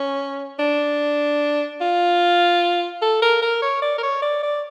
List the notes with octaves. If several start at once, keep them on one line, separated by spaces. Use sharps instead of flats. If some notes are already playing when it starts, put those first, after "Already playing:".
Already playing: C#4
D4
F4
A4
A#4
A#4
C#5
D5
A#4
C#5
D5
D5